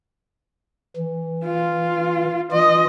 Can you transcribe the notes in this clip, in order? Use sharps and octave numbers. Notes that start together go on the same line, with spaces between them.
E3
F4
E3 F4 D#5